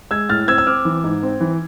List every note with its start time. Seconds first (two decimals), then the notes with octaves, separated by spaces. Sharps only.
0.11 G#3 E6 G#6
0.29 A2 F6 A6
0.48 C4 E6 G#6
0.58 E6
0.67 C4 D6 F6
0.85 E3
1.04 G#2
1.23 C4
1.41 E3